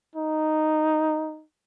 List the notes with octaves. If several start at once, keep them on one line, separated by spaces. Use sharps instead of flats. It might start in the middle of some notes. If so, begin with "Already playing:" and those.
D#4